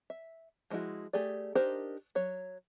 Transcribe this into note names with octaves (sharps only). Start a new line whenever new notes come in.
E5
F3 G#3 C#4 E4 F#4
A3 G4 G#4 D5
D4 D#4 G4 A#4 C5
F#3 C#5